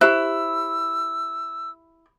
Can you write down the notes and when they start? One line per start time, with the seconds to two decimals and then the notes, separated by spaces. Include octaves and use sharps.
0.01 E4 G4 C5 E6